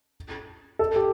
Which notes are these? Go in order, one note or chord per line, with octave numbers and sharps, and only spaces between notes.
A4
G4